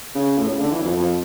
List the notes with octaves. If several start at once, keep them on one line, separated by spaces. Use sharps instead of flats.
C#3
A2
C#3
D3
E3
F2
F2